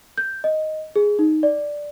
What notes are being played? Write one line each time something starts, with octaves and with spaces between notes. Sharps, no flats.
G6
D#5
G#4
D#4
D5